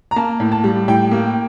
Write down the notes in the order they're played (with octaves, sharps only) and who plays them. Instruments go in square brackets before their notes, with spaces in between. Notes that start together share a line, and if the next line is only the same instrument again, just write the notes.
[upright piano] A#5
A#3 A5
A2
A5
G3
A2 G5
A#3